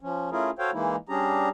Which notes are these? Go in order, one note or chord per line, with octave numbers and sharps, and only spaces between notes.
F3 C#4
A3 C#4 E4 F4 G#4 A#4
F#4 A4 C5 C#5 F5 G5
E3 G#3 A#3 D#4 E4
G3 C#4 D4 G4 G#4 A#5